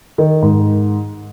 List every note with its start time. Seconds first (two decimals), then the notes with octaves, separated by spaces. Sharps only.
0.18 D#3
0.42 G#2